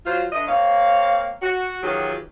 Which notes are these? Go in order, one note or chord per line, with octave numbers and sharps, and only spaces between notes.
F#3 F4 C5
D3 E3 E4 D#5
A#3 C4 C#5 F5
F#4
D#3 E3 F#3 F4 G4 G#4